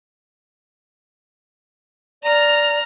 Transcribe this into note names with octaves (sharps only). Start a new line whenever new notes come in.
D5 A#5 F6